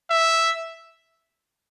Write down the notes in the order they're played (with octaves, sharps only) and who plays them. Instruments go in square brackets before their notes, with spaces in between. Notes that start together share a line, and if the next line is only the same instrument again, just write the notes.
[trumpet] E5